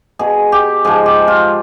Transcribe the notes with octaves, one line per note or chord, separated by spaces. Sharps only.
B2 G#4
G4
G#2 F3 G#4
G4
F4